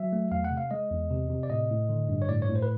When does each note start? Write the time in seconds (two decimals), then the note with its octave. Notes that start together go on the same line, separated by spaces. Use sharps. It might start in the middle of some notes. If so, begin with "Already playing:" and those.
Already playing: F#3 E5
0.13 A3
0.31 E2 F5
0.44 F#5
0.51 C3
0.57 F5
0.71 G#3 D#5
0.91 E2
1.10 C3
1.30 C3
1.43 D5
1.50 A2 D#5
1.70 A2
1.89 D3
2.09 G2
2.22 C#5
2.29 A2 D5
2.42 C#5
2.48 A2
2.56 C5
2.62 B4